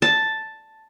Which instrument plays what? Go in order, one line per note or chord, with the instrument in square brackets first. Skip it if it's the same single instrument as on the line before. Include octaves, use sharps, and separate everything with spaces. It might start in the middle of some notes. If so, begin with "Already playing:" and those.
[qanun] A5